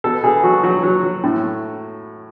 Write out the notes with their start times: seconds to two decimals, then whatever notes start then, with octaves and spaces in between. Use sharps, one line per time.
0.04 B2 A4
0.23 B2 G#4
0.43 F#3 F#4
0.63 F#3 F#4
0.83 F#3
1.03 F#3
1.24 A2